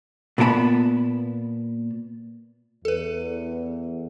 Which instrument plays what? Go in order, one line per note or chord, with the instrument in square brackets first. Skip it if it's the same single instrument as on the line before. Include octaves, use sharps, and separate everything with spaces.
[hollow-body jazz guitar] A#2 B3 A#4 A5 B5
[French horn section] E2 [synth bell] A4 B4